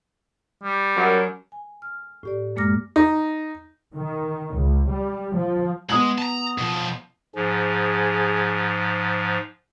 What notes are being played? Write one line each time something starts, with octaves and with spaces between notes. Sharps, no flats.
G3
F#2
G#5
F6
A2 G4 D5
F#2 G#3 A#3 D6 F6 A#6
D#4
D#3
C#2
G3
F3
G#3 B3 D#6 F#7
A5 A#5
B2 F3
G#2 F3 G#4